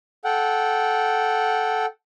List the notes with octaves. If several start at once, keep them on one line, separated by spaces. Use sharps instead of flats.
A4 F#5 G5